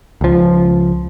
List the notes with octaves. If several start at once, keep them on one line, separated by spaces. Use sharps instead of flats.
C#2 F3